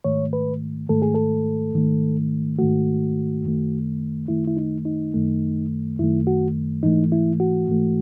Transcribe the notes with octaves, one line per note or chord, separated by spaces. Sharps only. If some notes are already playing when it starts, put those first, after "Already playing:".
G#2 D#3 A3 C#5
B4
G#2 D#3 A3 A4
G#4
A4
G#2 D#3 A3
G#2 D#3 A3 F#4
F#2 D#3 A3
F#2 D#3 A3 E4
E4
D#4
D#4
F#2 D#3 A3
F#2 D#3 A3 E4
F#4
G#2 E3 A3 D#4
E4
F#4
G#2 E3 A3